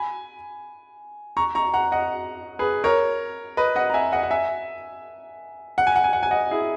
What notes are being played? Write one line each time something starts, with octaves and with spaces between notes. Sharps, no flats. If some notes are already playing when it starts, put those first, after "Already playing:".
Already playing: G#5 B5
A#5 C#6
A#5 C#6
F#5 A#5
D#5 F#5
G#4 B4
A#4 C#5
B4 D#5
D#5 F#5
A#5
E5 G#5
D#5 F#5
F#5
E5 G#5
F#5
G#5
F#5
G#5
F#5
G#5
D#5 F#5
E4 G#4